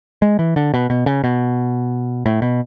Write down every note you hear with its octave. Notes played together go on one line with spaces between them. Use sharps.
G#3
E3
D3
B2
B2
C#3
B2
A2
B2